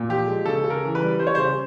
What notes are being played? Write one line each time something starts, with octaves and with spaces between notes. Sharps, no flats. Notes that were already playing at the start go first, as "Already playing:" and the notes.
Already playing: A#2
F3 G4
G#3
C#3 A4
C#3
A#4
E3
B4
G3
G3 C5
C#5
C#3 C5